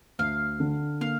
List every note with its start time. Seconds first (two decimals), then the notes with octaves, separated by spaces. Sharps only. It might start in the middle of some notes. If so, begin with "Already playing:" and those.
0.19 D2 F5
0.60 D3
1.01 A#3 F5